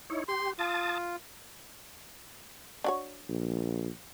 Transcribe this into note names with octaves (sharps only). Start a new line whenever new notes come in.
D#4 E4 C#5
G4 C6
F4 A5 D#6 A6
D4 F#4 C#5
A#1